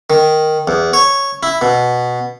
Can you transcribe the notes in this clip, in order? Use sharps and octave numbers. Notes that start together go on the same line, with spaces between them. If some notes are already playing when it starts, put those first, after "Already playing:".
D#3
E2
C#5
E4
B2